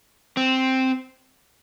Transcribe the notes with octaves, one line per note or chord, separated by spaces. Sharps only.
C4